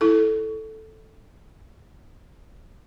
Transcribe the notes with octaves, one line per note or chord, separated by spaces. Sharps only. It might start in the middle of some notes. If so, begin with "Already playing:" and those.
E4 A4